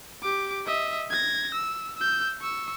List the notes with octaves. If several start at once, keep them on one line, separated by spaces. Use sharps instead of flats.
G4 D6
D#5 E5
G#6 A#6
E6
E6 G6
C#6 E6